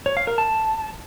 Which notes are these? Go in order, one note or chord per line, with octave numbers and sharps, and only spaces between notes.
C#5
F5
A#4
A5